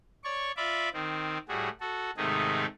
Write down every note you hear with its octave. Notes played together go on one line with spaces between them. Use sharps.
C#5 D5 C#6
F4 D5 E5 B5 D6
D#3 C4
A2 G3 F#4 G#4
F#4 A4
G#2 C3 D#3 A3 D#4 G#4